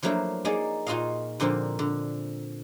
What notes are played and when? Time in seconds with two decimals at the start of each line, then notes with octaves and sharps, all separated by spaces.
0.02 F3 F#3 A3 A#3 D4 E4
0.45 A#3 D#4 G#4 D5
0.87 A#2 D#4 F4 F#4 D#5 F5
1.40 A#2 D3 F3 A#3 C4
1.79 D3